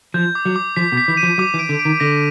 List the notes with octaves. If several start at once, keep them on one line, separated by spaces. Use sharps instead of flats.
F3 G6
D6
F#3
D6
F3 B6
B2
B6
E3
D#7
F3
F#3 D6
E3
D7
D3
D7
D#3
D3 A#6